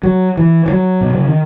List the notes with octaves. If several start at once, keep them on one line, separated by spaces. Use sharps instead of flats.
F#3
E3
E3
F#3
B2
C#3
D#3